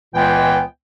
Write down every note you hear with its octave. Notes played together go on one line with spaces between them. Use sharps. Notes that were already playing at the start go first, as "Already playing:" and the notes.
C#2 A#2 E3 G#3 B3 G5